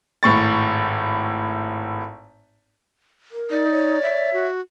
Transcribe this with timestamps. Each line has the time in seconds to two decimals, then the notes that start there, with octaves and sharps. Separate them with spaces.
0.23 G#1 A2 C#6 A6
3.32 A#4
3.51 D#4 D5
3.71 C#5
4.02 E5
4.33 F#4